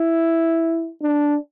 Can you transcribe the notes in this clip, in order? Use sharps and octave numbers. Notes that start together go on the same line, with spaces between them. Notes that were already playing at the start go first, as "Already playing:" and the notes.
Already playing: E4
D4